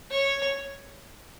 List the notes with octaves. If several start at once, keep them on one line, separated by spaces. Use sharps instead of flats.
C#5